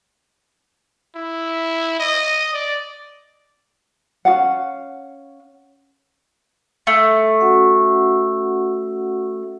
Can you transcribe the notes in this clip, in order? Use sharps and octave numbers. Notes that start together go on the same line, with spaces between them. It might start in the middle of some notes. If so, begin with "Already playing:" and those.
E4
D#5
D5
C#4 F#4 F5 F#5
A3
C#4 F#4 F#5